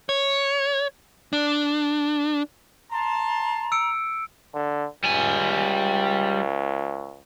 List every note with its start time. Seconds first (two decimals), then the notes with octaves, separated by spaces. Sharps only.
0.09 C#5
1.33 D4
2.92 A5 A#5 C6
3.72 E6 C#7 D7
4.54 D3
5.04 C#2 G3 G#5